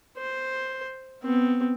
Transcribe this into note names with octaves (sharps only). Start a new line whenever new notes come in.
C5
B3 C4